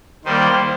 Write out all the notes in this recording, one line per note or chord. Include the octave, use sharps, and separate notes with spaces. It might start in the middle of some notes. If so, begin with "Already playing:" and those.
D#3 G3 A#3 C5